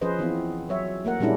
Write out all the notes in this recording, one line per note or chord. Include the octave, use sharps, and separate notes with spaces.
F3 C#4 G#4 B4 C5 D#5
E3 B3 C4 F4
F#3 C#5 E5
A3 A#3 A#4 F#5
A#2 G3 G#3 C#4 D4 E4